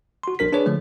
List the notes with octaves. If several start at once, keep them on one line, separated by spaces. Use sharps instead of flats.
F#4 C6
A#1 D4 A#4 B6
D4 G#4 B4 C#5
D3 F3 A3